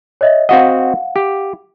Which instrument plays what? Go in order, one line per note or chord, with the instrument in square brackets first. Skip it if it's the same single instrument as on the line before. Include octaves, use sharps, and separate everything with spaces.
[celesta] C#5 D#5 E5
[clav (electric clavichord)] C4 F#4 D#5 [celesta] F5 F#5
[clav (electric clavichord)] G4